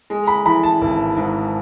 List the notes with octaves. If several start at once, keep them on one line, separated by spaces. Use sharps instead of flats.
G#3
B5
E3 B5
A5
G#1
G#2